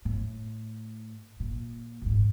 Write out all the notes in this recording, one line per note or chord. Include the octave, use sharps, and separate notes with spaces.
A2
A#2
A#1 G#2